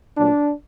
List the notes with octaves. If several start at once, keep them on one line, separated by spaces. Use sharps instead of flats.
A#2 F#3 A3 D4